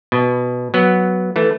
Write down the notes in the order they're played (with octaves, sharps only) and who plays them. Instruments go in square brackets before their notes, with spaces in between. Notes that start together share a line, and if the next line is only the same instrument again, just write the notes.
[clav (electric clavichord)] B2
F#3 B3
E3 A3